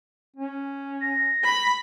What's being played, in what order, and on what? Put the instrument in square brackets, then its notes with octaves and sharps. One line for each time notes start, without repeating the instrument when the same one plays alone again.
[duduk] C#4
[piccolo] A#6
[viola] B5